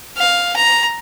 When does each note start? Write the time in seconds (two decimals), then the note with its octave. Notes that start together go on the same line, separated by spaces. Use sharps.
0.17 F5
0.56 A#5